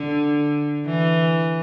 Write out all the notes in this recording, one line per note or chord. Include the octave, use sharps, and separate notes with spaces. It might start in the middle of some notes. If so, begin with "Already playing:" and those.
Already playing: D3
E3